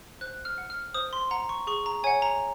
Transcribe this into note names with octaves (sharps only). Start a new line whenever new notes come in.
C5 F#6
F6
F#5
F6
C5 D#6
C6
F#5 A#5
C#6
G#4 C#6
A#5
C#5 F#5 G#5
A#5